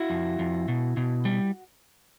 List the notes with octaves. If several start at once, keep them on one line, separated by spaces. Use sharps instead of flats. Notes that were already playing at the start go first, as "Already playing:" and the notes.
Already playing: E4 F#4
F2
F2
B2
B2
G3